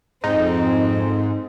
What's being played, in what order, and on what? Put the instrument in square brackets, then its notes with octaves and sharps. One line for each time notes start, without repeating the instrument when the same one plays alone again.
[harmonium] F2 [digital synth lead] G#2 [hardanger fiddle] C4 [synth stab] D#4